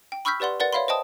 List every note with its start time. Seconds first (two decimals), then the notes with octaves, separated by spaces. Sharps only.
0.12 G5
0.25 B5 C#6 E6 F6 G6 B6
0.40 G4 B4 D5 F#5 C6
0.60 A#4 B4 D5 F#5 A6
0.73 C#5 E5 F5 B5 C6
0.88 C5 D#5 G5 A5 D#6